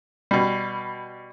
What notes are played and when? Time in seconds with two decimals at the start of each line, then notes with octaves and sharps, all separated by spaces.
0.31 B2 G3